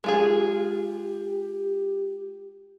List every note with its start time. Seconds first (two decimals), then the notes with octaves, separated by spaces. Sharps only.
0.04 G#3 F4 G4 G#4